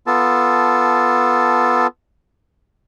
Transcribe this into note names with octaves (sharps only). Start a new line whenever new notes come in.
B3 F4 A4 A5